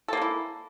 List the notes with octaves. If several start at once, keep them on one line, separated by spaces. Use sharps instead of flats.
G#3 A#3 E4 A4